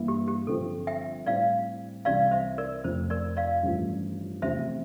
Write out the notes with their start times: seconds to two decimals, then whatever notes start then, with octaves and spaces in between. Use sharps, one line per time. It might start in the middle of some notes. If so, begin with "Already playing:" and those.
Already playing: G2 E3 A#3 E4
0.08 G4
0.28 G4
0.47 G1 G2 F3 C4 A4
0.87 E5 G5
1.26 A2 G3 C4 E4 D5 F5
2.05 C2 C3 E3 G3 D5 F5
2.31 C5 E5
2.58 A#4 D5
2.84 F2 C3 F3 A3 C4 C5
3.10 A#4 D5
3.37 D5 F5
3.63 A1 G2 F3 A3
4.42 E2 C3 F3 A3 C4 C5 E5